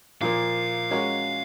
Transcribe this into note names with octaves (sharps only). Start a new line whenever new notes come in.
A#2 F3 A#3 F5
G#3 C#4 F#4 A#4 C#5